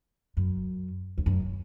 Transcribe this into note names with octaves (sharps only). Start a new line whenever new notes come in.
F#2
E2
F#2